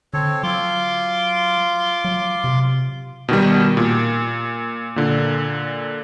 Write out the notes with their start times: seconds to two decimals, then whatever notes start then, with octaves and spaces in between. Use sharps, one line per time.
0.13 D3 C4 A4 C#5
0.43 F#3 F4 C6 D6
2.05 F#3
2.44 C3
3.28 B2 D#3 G3
3.77 A#2
4.96 A#2 D3